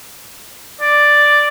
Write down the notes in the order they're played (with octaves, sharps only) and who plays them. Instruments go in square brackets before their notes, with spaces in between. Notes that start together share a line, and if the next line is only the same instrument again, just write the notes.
[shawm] D5